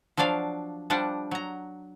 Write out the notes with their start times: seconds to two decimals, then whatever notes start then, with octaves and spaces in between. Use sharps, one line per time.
0.17 F3 F#3 D4 D5 F5
0.90 F3 G3 D4 D5 F#5
1.31 F#3 A#5